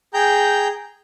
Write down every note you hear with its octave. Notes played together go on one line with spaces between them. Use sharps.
G#4 G5 A#5 G6